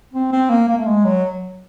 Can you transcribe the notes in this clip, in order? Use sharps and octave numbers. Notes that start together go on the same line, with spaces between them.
C4
C4
A#3
A#3
A3
G#3
F#3